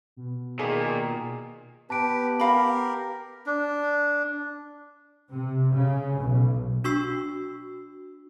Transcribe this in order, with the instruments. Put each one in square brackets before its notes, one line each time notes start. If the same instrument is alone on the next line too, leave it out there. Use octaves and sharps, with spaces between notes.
[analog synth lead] B2
[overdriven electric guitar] A#2 [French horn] D#3 [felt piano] G#4
[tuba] B3 [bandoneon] G4 B4 [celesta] A5 D7
[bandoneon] G4 A#4 [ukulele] F5 B5
[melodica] D4
[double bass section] C3
C#3
B1
[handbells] D4 F#4 C#6 E6 C7